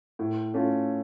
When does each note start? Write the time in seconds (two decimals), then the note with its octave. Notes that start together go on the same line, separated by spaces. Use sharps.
0.19 A2
0.54 A3 C#4 F4